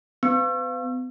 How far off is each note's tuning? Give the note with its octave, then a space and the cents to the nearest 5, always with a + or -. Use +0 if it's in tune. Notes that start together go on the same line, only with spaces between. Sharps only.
B3 +40